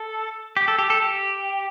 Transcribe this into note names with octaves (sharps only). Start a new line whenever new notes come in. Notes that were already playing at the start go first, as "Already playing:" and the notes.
Already playing: A4
G4
A4
G4
A4
G4